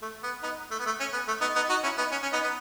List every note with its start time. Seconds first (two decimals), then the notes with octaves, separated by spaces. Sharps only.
0.02 A3
0.23 B3
0.43 B3 D#4
0.71 A3
0.79 B3
0.86 A3
1.00 C#4
1.13 B3
1.28 A3
1.41 B3 D#4
1.56 B3 D#4
1.69 D#4 F#4
1.83 C#4 E4
1.98 B3 D#4
2.11 C#4
2.23 C#4
2.33 B3 D#4
2.43 B3